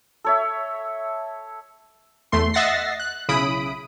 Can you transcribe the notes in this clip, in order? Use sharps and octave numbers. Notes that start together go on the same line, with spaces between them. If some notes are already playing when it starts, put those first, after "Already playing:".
A4 C#5 E5
E2 A3 C6
D#5 E5 F#5 A6 A#6 C7
F#6
B1 C#3 E4 B5 D#6 D7